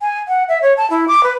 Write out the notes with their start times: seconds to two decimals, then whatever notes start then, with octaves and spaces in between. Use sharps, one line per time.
0.01 G#5
0.28 F#5
0.49 E5
0.62 C#5
0.77 A5
0.90 E4
1.08 D6
1.23 B4